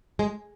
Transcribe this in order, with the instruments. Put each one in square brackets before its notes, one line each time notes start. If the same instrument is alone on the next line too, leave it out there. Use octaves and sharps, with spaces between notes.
[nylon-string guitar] G#3